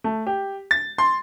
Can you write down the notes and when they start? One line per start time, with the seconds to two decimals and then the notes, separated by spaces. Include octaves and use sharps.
0.04 A3
0.27 G4
0.71 A6
0.98 C6